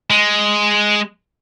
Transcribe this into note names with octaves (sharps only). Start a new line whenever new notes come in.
G#3